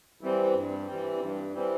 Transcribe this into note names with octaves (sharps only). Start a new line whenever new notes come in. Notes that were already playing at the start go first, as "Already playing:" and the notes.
E3 G3 C4
G2
E3 G3 C4
G2
E3 G3 C4